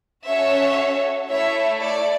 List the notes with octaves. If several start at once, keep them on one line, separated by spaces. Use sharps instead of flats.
C#4 F#4 A4 C#5 E5
A3 E4 A4 C#5 E5
D5